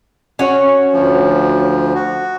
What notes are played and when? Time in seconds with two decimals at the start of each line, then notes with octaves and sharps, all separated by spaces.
0.39 C#4 F#4 C#5
0.93 D2 F3
1.95 F#4